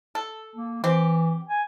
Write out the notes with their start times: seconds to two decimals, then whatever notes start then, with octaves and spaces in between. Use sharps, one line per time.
0.15 A4
0.56 A#3
0.84 E3 C4 G4
1.49 G#5